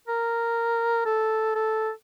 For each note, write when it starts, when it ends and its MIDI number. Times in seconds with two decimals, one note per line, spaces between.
0.07 1.05 70
1.05 1.54 69
1.55 1.90 69